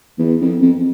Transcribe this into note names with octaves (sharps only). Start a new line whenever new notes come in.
E2
F2
F2